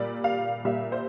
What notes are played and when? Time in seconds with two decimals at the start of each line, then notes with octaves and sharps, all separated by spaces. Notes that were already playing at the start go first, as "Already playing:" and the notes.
Already playing: A#2 G3 D5
0.24 F5
0.65 A#2 G3 E5
0.92 C5